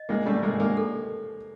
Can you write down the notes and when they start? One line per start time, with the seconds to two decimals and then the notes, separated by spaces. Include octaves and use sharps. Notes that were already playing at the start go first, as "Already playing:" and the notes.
Already playing: D#5
0.09 G#3 A#3 C#4
0.26 G3 A3
0.32 C#4
0.43 G#3 A#3
0.54 C#4
0.60 G#3 A#3
0.77 A4